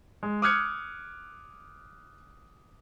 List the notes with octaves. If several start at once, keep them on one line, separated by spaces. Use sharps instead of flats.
G#3
D6 D#6 F6 F#6 G#6 C#7